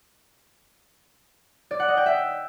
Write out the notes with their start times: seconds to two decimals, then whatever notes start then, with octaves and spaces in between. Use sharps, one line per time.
1.71 D5
1.80 F#5
1.88 D#5
1.97 G5
2.06 E5